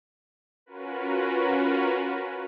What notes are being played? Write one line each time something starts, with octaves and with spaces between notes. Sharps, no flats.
C#4 F4 F#4 A#4 B4